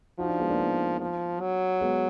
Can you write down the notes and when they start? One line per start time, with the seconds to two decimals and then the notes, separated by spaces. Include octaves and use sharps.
0.19 F3 D#4 F#4
0.29 D4 F4
0.39 G#3 B3
0.49 A#3 D4
0.59 B3 D#4
1.00 F3
1.41 F#3
1.81 G#3 B3